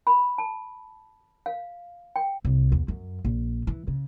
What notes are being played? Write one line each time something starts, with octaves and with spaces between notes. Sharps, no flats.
B5
A5
F5
G5
C2
E2
F#2
A#1
E3
C#3